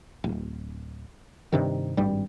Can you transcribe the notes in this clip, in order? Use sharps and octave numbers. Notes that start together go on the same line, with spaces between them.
D1
G2 C3 D#3
G#1 G2 G3